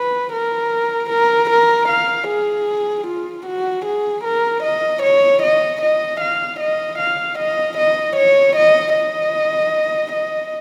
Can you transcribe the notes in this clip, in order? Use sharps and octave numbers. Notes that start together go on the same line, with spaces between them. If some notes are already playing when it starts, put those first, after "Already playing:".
Already playing: B4
A#4
A#4
A#4
F5
G#4
F4
F#4
G#4
A#4
D#5
C#5
D#5
D#5
F5
D#5
F5
D#5
D#5
C#5
D#5
D#5
D#5